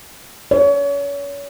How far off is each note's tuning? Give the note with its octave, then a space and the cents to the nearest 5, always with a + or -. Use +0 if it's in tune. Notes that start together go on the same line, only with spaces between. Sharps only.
C#5 +35